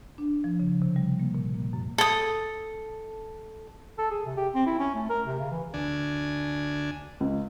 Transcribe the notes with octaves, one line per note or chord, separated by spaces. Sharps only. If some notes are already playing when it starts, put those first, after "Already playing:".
D4
F3
C#3
C3
G3
A#3
A#2
A#3
F#2
A4 D#6
A4
G#4
C3
G4
C4
E4
C#4
A3
A#4
C3
C#3
E3
D2 D4 G#5
C#2